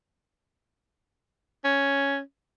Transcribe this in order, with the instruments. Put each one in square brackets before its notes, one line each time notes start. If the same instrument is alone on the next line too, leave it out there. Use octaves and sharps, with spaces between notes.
[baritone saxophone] C#4